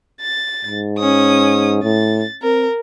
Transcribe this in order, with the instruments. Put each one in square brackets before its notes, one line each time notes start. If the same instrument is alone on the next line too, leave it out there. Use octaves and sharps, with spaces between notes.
[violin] A6
[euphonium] G#2
[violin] C#4 D#6
[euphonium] A2 [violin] A6
[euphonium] C4 [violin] A#4